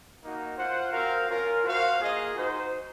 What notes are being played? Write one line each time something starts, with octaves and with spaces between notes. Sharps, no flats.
A#3 D#4 F#4
F4 C5 F#5
C4 F#4 A#4 F5
C#4 F4 A#4
F#4 C5 F5
A#3 F4 G#4 D#5
D#4 F#4 C5